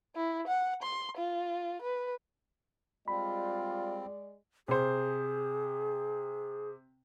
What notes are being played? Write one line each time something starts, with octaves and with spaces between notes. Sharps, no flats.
E4
F#5
C6
F4
B4
G3 G#3 C4 F4 D5 B5
C3 G#4 C5